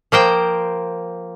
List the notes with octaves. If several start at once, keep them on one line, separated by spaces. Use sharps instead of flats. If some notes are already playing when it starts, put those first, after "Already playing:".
F3 A#3 C5 G5